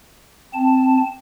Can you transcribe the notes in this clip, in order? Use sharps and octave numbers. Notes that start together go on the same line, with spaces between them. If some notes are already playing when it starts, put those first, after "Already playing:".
C4 A5